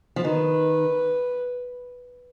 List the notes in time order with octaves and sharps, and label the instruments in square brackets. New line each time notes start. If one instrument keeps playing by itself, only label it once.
[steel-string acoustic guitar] F3
[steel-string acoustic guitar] D#3 [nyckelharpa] B4